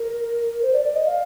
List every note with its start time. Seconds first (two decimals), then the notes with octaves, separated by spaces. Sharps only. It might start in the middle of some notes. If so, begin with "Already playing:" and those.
Already playing: A#4
0.62 C5
0.73 D5
0.84 D5
0.94 D#5
1.06 F5